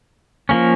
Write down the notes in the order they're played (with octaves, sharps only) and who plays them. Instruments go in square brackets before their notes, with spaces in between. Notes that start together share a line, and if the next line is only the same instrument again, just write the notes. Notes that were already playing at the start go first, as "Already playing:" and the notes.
[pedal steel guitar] F3 A#3 C#4